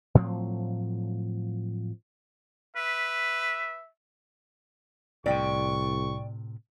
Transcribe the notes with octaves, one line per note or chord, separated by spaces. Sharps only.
A2 F3 F#3 C4
B4 E5
C2 A2 C3 D5 G5 C#6